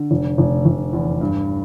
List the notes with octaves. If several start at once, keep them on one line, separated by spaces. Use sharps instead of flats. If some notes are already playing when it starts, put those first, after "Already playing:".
Already playing: D3
F1
F1
F1
E2
G2